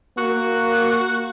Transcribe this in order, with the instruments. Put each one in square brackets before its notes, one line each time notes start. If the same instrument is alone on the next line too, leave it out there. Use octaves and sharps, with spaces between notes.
[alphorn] A#3 [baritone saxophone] F#4